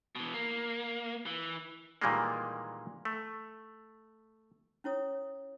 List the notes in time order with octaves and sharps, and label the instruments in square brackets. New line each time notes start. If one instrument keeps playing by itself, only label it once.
[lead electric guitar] B2 E3
A#3
E3
[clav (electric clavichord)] A#2 D#3 E3 G3 G#3 A#3
A3
[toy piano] C#4 E4 C#5 D#6